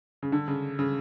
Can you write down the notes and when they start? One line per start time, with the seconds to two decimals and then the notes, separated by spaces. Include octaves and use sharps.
0.23 C#3
0.32 D3
0.48 C#3
0.79 C#3